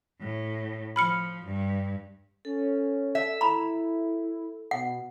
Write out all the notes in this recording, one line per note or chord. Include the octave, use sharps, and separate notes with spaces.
A2
F3 B5 F6 C#7
G2
C#4 A4
E5
E4 A#5 B5
B2 F#5